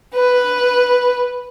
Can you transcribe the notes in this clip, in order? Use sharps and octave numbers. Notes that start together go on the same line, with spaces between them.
B4